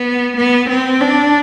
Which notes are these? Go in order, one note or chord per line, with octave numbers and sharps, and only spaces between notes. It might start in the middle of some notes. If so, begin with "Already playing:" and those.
Already playing: B3
B3
C4
D4